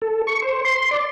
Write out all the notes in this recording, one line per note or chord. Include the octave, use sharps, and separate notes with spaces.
A4
C#6
C5
C6
D5